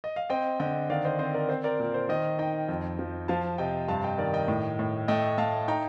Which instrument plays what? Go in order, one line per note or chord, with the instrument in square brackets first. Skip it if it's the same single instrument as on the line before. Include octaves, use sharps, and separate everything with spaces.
[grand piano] D#5
F5
C4 D#5 G5
D3 D#5 G5
D#3 D5 F5
C5 D#5
C4 C5 D#5
A#4 D5
C4 C5
A#4 D5
A#2
C5
D#3 C5 D#5
D#4 D#5 G5
F2
F3
F3 F5 A5
C3 D#5 G5
G2 F5 A5
D#5 G5
D#3 A#4 D5
D#5 G5
A2
A2
A3 D#5 G5
A3 F5 A5
D#4 G5 A#5